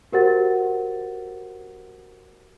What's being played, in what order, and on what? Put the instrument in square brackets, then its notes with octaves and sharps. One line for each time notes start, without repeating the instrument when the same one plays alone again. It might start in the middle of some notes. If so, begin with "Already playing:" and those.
[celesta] F#4 G4 A#4 C5 F#5 A6